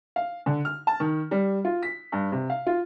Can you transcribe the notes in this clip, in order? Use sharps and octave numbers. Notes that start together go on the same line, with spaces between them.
F5
D3
F6
A5
D#3
G3
F4
B6
G2
C3
F5
F4